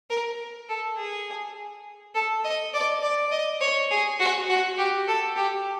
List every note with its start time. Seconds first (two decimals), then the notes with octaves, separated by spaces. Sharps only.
0.10 A#4
0.69 A4
0.97 G#4
2.15 A4
2.44 D#5
2.74 D5
3.03 D5
3.32 D#5
3.61 C#5
3.91 G#4
4.20 F#4
4.49 F#4
4.78 G4
5.08 A4
5.37 G4